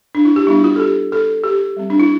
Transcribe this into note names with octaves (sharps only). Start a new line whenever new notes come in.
D4
E4
G4
G3 B3 D4 E4
F4
A4
G4
A4
G4
G3 C4
D4
E4